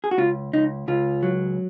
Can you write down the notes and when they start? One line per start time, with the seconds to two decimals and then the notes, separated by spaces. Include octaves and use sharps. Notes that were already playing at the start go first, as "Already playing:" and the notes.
0.04 G#4
0.11 F#4
0.18 C#2 F4
0.53 C#2 D#4
0.88 C#2 F4
1.23 F#3